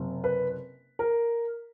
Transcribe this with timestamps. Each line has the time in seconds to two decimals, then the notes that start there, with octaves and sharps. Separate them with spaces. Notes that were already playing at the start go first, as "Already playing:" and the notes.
Already playing: F#1 C3
0.24 B4
0.99 A#4